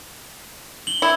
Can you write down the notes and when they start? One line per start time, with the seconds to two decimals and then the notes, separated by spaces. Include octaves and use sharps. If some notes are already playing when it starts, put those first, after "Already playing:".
0.87 F#7 G7
1.02 E4